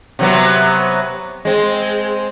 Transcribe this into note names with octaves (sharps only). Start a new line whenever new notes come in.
C3 F#3 B3
G#3 C4